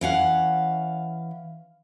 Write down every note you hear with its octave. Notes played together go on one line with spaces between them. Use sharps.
E3 C#4 F5 F#5